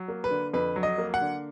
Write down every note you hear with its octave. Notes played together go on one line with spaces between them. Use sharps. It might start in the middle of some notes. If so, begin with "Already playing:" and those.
Already playing: F#3
A#3
B4
D3
F2 B4
F#3
D#5
A#3
F#5
D3